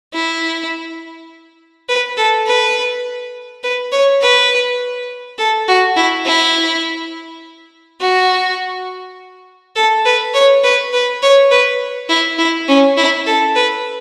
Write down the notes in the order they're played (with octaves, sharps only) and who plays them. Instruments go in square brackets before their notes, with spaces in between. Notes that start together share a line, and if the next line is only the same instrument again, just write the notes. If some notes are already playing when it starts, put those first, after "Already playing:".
[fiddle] E4
B4
A4
B4
B4
C#5
B4
A4
F#4
E4
E4
F#4
A4
B4
C#5
B4
B4
C#5
B4
E4
E4
C#4
E4
A4
B4